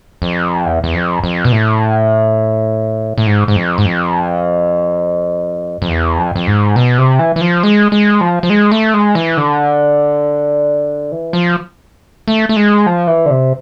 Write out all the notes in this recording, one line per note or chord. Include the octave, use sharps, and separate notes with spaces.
F2
E2
E2
F2
F2
B2
A2
A2
G#2
G#2
F2
G#2
F2
F2
E2
F2
F2
G#2
B2
C3
E3
E3
F3
G#3
G#3
F3
F3
G#3
A3
G#3
E3
D3
E3
F3
A3
A3
G#3
F3
E3
D3
C3